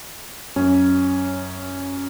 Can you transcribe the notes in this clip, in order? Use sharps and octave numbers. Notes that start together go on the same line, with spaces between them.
F#2 C#4